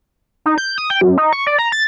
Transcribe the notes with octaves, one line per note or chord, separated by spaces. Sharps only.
D#4
G6
D#6
G5
F#2
D#4
C#6
D5
A#5
A6